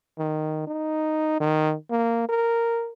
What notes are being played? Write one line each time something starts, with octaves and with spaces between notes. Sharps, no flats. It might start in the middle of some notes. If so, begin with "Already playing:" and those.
D#3
D#4
D#3
A#3
A#4